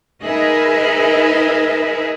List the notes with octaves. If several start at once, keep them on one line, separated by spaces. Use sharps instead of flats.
D#4 G#4 A#4 B4 D#5 E5